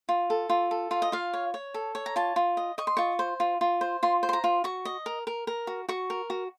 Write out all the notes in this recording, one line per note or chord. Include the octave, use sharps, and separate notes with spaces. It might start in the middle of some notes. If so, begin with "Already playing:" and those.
F4
A4
F4
A4
F4 F5
D#5
F4 F5
C#5
C#5
A4
C#5
A#5
F4 A5
F4
D#5
D#5 C#6
C6
F4 C#6
C5
F4
F4
C5
F4 C6
C5
C6
A#5
F4
F#4 C#6
D#5
A#4
A#4
A#4
F#4
F#4 C#6
A#4
F#4